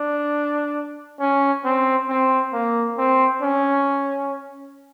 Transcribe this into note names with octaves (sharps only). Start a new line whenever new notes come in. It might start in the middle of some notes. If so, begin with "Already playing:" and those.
Already playing: D4
C#4
C4
C4
A#3
C4
C#4